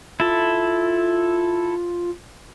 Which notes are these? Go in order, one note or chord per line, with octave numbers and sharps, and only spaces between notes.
E4 F4 A4